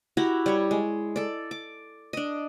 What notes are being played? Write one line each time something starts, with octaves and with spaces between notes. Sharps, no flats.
E4 F#4 G4 A#5
G3 C#5
G#3
A4 D5
D6
D4 D#5